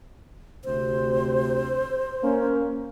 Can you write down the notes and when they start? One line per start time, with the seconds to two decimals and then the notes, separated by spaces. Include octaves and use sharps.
0.65 D2 C3 C5
2.23 A#3 C#4